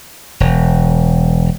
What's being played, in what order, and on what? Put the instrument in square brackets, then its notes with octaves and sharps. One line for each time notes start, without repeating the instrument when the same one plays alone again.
[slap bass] E1